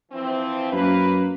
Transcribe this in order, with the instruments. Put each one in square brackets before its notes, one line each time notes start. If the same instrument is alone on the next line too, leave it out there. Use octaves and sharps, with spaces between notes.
[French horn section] E3 F3 C4
[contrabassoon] F#2 [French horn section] A#3 B4